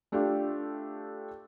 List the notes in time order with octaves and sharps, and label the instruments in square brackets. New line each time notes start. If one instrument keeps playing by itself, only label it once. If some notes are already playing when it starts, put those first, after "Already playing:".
[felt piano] A3 D4 F4 G4